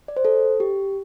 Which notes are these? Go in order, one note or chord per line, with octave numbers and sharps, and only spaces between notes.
D5
C5
A4
G4